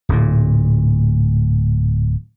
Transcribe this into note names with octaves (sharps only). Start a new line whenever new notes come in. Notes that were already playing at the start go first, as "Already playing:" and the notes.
D1 A#2